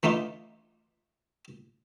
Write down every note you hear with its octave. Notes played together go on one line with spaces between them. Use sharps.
E3 A3 D4 D#4 F4